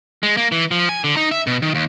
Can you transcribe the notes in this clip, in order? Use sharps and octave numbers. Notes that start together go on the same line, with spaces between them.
G#3
A#3
E3
F3
G#5
D3
D#4
E5
B2
D#3
D#2